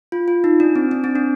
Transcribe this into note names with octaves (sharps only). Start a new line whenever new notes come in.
F4
F4
D#4
D4
C4
D4
C4
D4